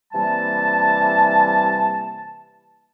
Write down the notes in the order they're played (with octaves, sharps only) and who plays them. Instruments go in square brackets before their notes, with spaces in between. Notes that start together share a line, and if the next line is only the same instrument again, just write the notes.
[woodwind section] C3 E3 G3 A#3 A5